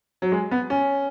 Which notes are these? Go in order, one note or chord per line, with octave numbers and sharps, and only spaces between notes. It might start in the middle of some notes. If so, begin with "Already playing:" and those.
F#3
G#3
B3
C#4